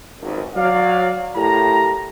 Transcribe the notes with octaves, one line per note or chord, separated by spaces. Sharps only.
G#1 C#2 F#2
F#3 D5 F5
A2 G4 A#4 A5 A#5